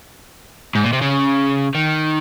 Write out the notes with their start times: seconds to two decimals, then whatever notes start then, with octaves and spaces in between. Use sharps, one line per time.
0.75 G#2
0.84 A#2
0.93 C3
1.01 C#3
1.75 D#3